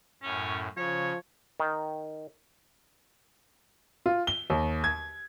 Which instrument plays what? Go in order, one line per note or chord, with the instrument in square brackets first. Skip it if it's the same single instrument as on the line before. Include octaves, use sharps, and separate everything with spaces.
[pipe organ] F#2 A2 [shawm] C#4
[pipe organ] C#3 [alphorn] F3 [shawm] C#5
[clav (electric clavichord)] D#3
[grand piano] F4
G7
D#2
G#6